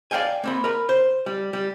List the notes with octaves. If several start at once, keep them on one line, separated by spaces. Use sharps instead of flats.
D5 E5 F5 G5 G#5
A#3 C4 B5
A#4 B5
C5
G3
G3